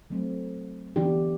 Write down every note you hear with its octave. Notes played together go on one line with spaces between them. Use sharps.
F#3 A3 C4
E3 B3 D4 G4